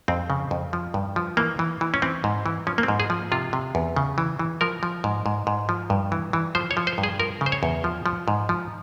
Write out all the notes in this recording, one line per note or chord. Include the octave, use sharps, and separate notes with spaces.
F2 C4
C#3
F2
F3
G2
F3
E3 A#3
E3
E3
C#4
E3 C4
G#2
E3
F3 C#4
A#3
C4
G#2
G#4
F3
C3 F4
C3
E2
C#3
E3
E3
F3 A#4
F3
G#2
G#2
G#2
F3
G2
E3
E3
F3 C5
C#5
F3
C5
G2
G#4
F3 A#4
C#3
C5
C#5
E2
F3
F3
G#2
F3